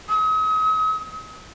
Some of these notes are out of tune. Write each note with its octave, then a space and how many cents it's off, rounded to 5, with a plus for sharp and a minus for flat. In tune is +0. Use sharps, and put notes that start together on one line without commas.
D#6 +40